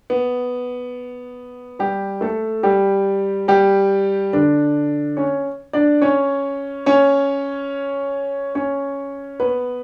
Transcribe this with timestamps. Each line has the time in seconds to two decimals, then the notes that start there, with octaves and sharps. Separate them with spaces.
0.10 B3
1.79 G3 G4
2.21 A3 A4
2.63 G3 G4
3.48 G3 G4
4.33 D3 D4
5.17 C#4 C#5
5.73 D4 D5
6.02 C#4 C#5
6.86 C#4 C#5
8.55 C#4 C#5
9.40 B3 B4